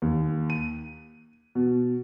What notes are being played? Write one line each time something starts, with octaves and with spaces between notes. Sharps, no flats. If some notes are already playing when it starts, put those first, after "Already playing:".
D#2
D#7
B2